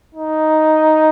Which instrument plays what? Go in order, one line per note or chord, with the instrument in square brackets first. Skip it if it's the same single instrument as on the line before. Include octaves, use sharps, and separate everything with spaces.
[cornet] D#4